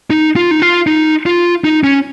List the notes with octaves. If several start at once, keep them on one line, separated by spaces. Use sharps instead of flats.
D#4
F4
D#4
F4
D#4
F4
D#4
C#4